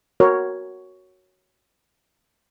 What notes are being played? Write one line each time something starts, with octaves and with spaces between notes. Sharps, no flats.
F#4 A#4 C#5